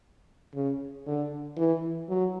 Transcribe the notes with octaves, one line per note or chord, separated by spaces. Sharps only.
C#3
D3
E3
F#3